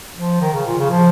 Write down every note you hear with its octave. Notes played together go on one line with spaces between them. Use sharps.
F3
D#3
C#3
A#2
C#3
F3